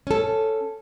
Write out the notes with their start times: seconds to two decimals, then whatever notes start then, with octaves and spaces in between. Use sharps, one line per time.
0.07 C#4 A4